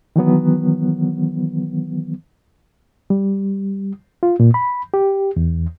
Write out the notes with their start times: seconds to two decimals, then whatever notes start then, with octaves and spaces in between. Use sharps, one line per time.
0.16 D#3 E3 F#3 B3
3.10 G3
4.23 F4
4.40 A#2
4.54 B5
4.94 G4
5.36 E2